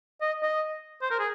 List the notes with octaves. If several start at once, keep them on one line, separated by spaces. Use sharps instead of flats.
D#5
D#5
C5
A#4
G#4